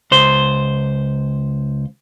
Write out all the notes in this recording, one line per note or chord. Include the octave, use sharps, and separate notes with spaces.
C#2 C5